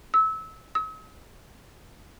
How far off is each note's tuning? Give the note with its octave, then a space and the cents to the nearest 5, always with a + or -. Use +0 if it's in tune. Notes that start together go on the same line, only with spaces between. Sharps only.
E6 -25
E6 -45